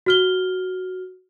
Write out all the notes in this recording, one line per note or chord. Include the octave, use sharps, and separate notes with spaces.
F#4 F6 G7